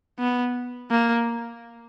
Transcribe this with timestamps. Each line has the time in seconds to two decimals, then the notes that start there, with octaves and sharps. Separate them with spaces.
0.19 B3
0.91 A#3